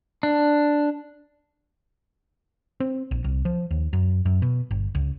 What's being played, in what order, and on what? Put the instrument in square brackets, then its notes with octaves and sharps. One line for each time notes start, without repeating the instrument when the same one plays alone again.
[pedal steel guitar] D4
[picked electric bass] C4
A#1
C2
F3
D#2
F#2
F#2
B2
G1
C#2